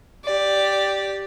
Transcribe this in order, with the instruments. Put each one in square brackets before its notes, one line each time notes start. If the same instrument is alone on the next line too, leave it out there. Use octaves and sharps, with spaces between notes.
[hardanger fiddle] G4 D5